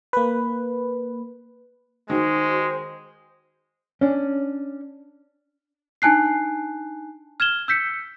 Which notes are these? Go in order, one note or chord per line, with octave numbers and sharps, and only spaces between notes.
A#3 B4
D#3 G#3 F#4 C5
C#4 D4
D4 D#4 G#5 A5 F#6 C7
F6 G#6 E7 G7
E6 G6 B6 C#7